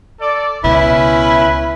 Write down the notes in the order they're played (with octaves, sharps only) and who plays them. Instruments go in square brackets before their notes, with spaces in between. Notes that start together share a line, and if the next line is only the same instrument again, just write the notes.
[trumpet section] A4 D5
[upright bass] C#2 B2 [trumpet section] C#4 B4 [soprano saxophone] E4